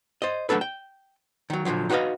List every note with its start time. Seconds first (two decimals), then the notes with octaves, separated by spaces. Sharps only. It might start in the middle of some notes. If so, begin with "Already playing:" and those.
0.22 C5 D#5
0.49 F#3 A3 D4 A4 B4
0.61 G5
1.50 D#3 F#3
1.65 A#2 D3 D#3 F3 F#3
1.90 D#4 F#4 B4 C5 D#5 F5